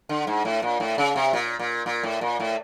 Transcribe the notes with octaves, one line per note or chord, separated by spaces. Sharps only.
D3
G#2
A2
A#2
A2
C#3
C3
A#2
A#2
A#2
A2
A#2
A2